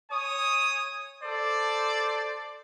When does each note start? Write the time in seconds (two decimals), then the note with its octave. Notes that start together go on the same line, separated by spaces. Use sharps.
0.11 C#5 G#5 D#6
1.23 A4 C5 D5